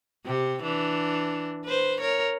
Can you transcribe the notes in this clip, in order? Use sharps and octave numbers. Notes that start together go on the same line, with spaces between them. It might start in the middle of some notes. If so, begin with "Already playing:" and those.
C3 G4
E3 D4
B4 C5
A#4 C#5